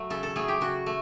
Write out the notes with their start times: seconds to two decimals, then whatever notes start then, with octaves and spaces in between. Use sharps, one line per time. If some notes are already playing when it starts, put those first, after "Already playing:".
Already playing: F#3 A3
0.10 C#3 A4
0.23 A4
0.35 F#3 A3 G#4
0.48 G4
0.61 C#3 F#4
0.86 A3